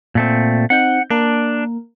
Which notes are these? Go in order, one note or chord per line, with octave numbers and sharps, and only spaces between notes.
A#2 A3 C4
C4 D#4 F#5 G6
A#3 D4 A#4